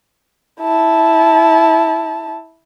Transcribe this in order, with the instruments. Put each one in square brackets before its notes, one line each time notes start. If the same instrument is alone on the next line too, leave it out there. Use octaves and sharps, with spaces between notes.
[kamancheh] E4 A5